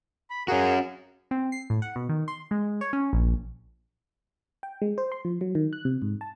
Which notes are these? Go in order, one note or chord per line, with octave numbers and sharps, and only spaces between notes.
B5
C#4 F#4 G#4 A#4 F5
C4
C7
A2
F#5
B2
D#3
C6
G#3
C#5
C#4
A#1
G5
G#3
C5
C6
F3
F#3
D#3
F#6
C3
G#2
A5